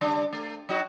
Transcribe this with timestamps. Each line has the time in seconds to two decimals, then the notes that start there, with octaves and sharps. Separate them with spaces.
0.01 C#3 G3 D4
0.33 A3
0.69 F#3 D#4 F#4